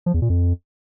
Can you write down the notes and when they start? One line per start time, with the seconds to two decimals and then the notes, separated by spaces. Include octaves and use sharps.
0.06 F3
0.14 E2
0.22 A#2
0.30 F2